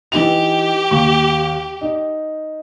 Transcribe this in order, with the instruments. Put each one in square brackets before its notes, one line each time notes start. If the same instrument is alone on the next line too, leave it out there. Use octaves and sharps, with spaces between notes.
[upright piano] E3 D#4 F7 [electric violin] G4
[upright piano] D#2 C#6
D#4